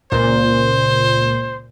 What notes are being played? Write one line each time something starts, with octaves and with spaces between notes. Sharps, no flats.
C#2 A#2 C5